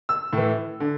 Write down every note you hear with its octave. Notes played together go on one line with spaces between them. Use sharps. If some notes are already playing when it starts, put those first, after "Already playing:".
E6
A2 E3
D3